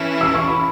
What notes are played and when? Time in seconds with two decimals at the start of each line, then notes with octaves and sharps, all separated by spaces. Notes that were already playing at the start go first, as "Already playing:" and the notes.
Already playing: E3 C#4 E4 A4
0.21 E6
0.34 C#6
0.48 B5